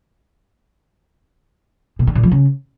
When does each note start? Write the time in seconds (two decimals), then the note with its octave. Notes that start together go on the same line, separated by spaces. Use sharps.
1.99 B2
2.07 D3
2.15 A#2
2.23 F3
2.32 C#3